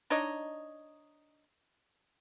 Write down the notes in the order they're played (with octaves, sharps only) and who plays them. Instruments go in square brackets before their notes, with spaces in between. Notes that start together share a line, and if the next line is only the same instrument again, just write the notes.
[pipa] D4 D#4 C#5 D#5